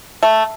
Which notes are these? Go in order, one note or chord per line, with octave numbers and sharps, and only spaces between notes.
A3